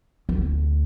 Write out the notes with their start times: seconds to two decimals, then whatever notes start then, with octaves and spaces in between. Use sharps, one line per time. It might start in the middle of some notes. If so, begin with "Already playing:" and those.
0.29 D2